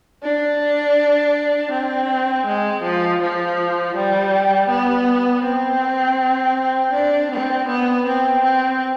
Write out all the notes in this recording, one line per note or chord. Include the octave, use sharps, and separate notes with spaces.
D4
C4
G#3
F3
F3
G3
B3
C4
D4
C4
B3
C4
C4